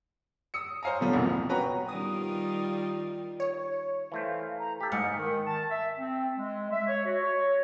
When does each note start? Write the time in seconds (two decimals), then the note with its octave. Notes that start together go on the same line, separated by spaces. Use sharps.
0.54 D#6 E6 C#7
0.83 C5 C#5 F5 G#5 A#5
1.00 B2 D3 F3 G3
1.13 E1 C2 G#2 A#3 C4
1.27 B2
1.49 C#4 F#4 B4 G5 A#5 C#6
1.89 D#3 G3 F4 D#6
3.40 C#5
4.12 E3 A3 C5 F5
4.59 A#5
4.80 G4 A4 B6
4.92 G#2 D#5 F5 C#7
5.18 D#3
5.47 A5
5.70 E5
5.98 C4
6.38 G#3
6.71 E5
6.87 C#5
7.06 F#4
7.23 C#5